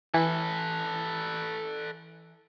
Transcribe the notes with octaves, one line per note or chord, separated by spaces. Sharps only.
E3 A4 B4